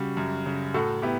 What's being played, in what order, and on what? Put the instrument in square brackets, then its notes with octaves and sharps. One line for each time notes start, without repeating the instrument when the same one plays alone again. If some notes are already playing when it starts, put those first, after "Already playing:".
Already playing: [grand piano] C#3 G3 [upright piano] F#4
[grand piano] F#2
C#3
[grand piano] A2 [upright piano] F#4 A4
[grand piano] B3 [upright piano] E4 G4